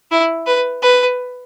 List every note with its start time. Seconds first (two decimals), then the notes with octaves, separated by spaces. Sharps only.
0.11 E4
0.47 B4
0.83 B4